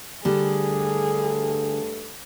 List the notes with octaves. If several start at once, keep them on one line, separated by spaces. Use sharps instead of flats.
G2 D3 G3 A3 G#4 A4